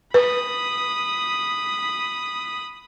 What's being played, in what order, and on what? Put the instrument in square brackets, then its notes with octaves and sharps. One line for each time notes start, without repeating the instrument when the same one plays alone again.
[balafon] B4 [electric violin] B5 D#6